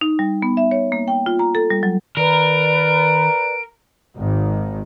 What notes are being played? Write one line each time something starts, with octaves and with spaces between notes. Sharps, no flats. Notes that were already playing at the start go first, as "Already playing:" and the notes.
D#4
G3
B3
E5
C#5
A#3
G5
F4
A#5
A4
G3
F#3
D#3 A#4 B4 D5 D7
G#1 D#3